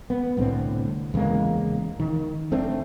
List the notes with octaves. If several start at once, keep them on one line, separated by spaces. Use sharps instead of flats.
B3
C2 A2 D3 C4
E2 C#3 G#3 A#3
D#3
F1 A3 C4 D4